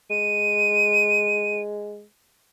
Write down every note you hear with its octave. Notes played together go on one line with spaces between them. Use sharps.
G#3 D#7